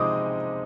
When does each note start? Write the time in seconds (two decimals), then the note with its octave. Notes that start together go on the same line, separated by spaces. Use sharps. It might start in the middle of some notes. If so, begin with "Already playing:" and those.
Already playing: C3 F3 G#3 C4 D#4 D6 D#6